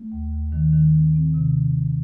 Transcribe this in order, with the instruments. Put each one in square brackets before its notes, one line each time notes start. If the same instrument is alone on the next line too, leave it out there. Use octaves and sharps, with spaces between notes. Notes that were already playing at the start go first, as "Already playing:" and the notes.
Already playing: [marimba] A3
D#2
D#2
D#3
D#3
C4
C4
C3